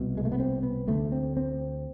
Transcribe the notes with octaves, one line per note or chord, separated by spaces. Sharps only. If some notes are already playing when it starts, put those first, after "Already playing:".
Already playing: C2 B2
G#3
A3
B3
C4
B3
D2 D3 A3
C4
C4